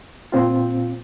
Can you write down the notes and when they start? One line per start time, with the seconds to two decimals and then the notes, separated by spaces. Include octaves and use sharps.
0.32 A#2 C4 F4